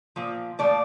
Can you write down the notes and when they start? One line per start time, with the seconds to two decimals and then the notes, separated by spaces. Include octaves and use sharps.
0.16 A#2 F3
0.59 A#2 F3 A3 D5